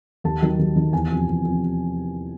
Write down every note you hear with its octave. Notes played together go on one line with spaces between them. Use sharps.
D#2 A5
D#3 F#3
D#2
D#3 F#3
E2 G#5
C3 F3
E2
C3 F3